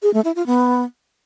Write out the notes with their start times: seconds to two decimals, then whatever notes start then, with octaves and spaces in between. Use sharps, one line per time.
0.03 G#4
0.14 A3
0.25 E4
0.36 F4
0.47 B3